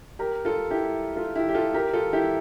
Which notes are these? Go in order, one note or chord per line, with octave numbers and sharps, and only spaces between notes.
G4 A#4
F4 A4
E4 G4
F4 A4
E4 G4
G4
F4 A4
G4 A#4
F4 A4
E4 G4